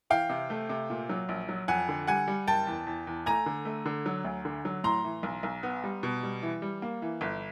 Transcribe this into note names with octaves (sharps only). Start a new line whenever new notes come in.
E3 F5 G5
C3
A3
C3
A#2
F#3
A#1
F#3
F2 F#5 G#5
D3
G3 F#5 G#5
G3
F#1 G5 A5
E2
E2
E2
A3 G#5 A#5
D3
A3
D3
F#3
D2
D3
F#3
A2 A#5 C6
E3
B1
B1
B3
G3
B2
G3
E3
G3
A#3
E3
G1